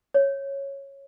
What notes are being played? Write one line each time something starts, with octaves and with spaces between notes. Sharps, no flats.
C#5